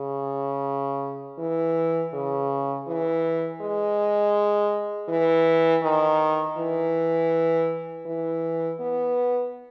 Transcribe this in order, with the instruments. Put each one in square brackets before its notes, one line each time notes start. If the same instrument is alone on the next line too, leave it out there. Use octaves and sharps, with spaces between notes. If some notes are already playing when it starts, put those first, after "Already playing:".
Already playing: [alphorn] C#3
E3
C#3
E3
G#3
E3
D#3
E3
E3
B3